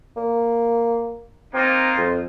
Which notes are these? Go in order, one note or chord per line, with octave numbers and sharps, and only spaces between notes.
A#3
A#3 C4 D#4 F4
F2